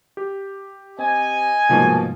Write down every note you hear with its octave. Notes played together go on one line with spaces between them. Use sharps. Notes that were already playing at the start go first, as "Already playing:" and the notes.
G4
C4 D#5 G#5
C2 G#2 B2 F3 A#3